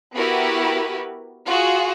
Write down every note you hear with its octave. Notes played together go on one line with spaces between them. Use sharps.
B3 E4 F#4 G4 A#4 B4
F4 F#4 G#4